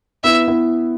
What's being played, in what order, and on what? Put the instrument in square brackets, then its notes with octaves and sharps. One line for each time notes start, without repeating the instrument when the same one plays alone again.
[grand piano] B3 E4 [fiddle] E5
[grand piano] B3 E4